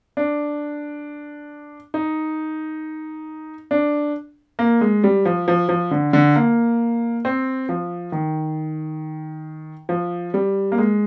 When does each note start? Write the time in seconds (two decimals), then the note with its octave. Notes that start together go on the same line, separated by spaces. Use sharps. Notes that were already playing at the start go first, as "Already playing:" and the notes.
0.17 D4
1.94 D#4
3.71 D4
4.59 A#3
4.81 G#3
5.04 G3
5.25 F3
5.48 F3
5.69 F3
5.91 D3
6.13 D3
6.36 A#3
7.25 C4
7.69 F3
8.12 D#3
9.89 F3
10.34 G3
10.72 A#3
10.78 G#3